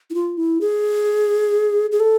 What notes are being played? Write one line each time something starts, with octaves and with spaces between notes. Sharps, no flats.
E4
F4
E4
G#4
G#4
A4